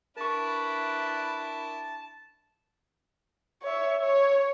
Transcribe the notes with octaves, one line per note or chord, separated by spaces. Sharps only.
D4 E4 A#4 B4 A5 C#6
C#5 E5
C#5